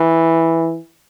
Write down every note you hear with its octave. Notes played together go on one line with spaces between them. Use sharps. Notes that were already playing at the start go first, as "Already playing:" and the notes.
Already playing: E3